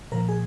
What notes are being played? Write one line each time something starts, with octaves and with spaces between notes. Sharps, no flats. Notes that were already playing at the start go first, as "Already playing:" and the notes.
A#2 F3 A#4
G#4